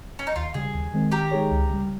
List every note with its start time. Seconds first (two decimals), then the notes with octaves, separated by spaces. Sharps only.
0.19 C#4
0.27 D#4
0.35 D#2 F4
0.54 C#3 G3 G#4
0.74 D#2
0.93 D#3 G#3 C4
1.12 D#3 G4 A#4
1.31 G#3 D#4 G#4 C#5
1.50 C#2
1.70 C#3 G3